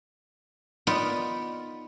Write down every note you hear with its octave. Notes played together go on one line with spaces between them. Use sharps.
B3 D#4 F4 A#4 D5 D#5